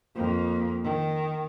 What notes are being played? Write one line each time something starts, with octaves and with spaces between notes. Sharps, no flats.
F2 A#3
D#3